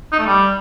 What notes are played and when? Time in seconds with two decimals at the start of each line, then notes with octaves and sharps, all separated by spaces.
0.12 D#4
0.19 A3
0.26 G3